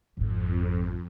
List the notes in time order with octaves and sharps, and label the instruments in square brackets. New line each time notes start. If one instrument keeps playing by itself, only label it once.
[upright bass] G#1 G#2 [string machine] F2